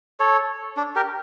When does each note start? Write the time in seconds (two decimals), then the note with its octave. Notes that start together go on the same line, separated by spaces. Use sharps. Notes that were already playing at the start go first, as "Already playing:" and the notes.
0.20 A4 C#5
0.77 D4
0.96 G4 A#4